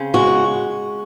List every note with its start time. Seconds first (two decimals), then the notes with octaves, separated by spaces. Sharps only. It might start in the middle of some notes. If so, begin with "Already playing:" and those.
Already playing: C#3 C4
0.14 G#3 F#4